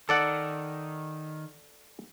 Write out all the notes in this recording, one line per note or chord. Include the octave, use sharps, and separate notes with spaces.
D#3 A4 D5 F#5